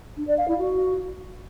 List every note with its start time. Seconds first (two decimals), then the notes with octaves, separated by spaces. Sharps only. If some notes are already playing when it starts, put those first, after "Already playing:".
0.17 D4
0.27 D5
0.37 F5
0.48 E4
0.58 F#4